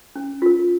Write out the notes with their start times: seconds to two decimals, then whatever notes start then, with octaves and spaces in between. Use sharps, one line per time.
0.16 C#4
0.42 F4 A#4